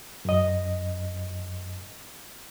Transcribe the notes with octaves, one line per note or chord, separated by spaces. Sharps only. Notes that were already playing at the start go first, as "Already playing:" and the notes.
F#2 D#5